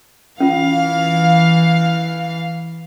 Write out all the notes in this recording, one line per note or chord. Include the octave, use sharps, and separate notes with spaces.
E3 C#4 F4 F5